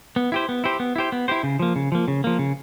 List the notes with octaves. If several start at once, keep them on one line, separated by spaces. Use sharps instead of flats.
B3
E4 G4 C5
B3
E4 G4 C5
B3
E4 G4 C5
B3
E4 G4 C5
C#3
F3 A#3
C#3
F3 A#3
C#3
F3 A#3
C#3